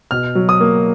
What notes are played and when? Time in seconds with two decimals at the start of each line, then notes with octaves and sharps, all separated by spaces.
0.11 B2 F6
0.35 F#3
0.49 D#6
0.60 A#3